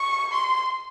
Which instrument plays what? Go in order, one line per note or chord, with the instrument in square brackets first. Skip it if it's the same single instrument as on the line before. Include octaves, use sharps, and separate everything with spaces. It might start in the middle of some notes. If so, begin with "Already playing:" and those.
Already playing: [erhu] C#6
C6